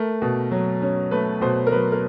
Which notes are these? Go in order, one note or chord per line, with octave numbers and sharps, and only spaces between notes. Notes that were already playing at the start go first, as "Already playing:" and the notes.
Already playing: A3 A#4
B2
F#3
C#4
A3 B4
B2 C5
A#4
F#3 B4
A#4